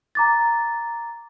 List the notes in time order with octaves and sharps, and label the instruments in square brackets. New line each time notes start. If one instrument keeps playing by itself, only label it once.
[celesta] A#5 D6 A6